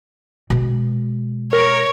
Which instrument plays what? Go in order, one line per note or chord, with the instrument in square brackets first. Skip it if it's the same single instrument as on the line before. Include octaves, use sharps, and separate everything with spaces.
[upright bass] B2 G#3
[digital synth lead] A#4 [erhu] C#5